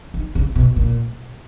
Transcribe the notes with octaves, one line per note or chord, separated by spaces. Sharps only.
D#3
C#3
B2
A#2